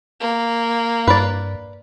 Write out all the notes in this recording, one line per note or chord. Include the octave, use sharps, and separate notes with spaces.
A#3
G2 B4 D5